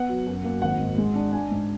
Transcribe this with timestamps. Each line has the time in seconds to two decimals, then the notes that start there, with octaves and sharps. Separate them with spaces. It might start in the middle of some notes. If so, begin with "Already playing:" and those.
Already playing: B3 F#5
0.09 F#3
0.27 F#2
0.44 A#3
0.62 G#1 F#5
0.80 G#2
0.98 G#3
1.15 D4
1.32 D4 G#5
1.51 G#2